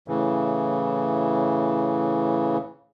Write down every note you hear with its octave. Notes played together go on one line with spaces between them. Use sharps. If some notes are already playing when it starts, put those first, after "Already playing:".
A2 C#3 E3